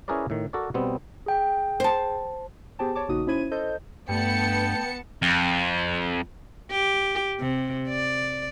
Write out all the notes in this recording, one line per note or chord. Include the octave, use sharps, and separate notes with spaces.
C#4 E4 G#4 A#4 B4 D5
A2 D#3
F#4 A4 A#4 D5
B2 G3 B3 C4
G#4 G5
C5 A5
B3 G4 G#4 C5 G5 A5
C#5 A5 D6
A#1 C#3 A#3 D#4 F#4 D#6
C#4 E4 C5 B5 G#6 D#7
A4 C5 D#5 G6
G2 A3 B3 G5 A5 C#7
F2
G4
C3
D5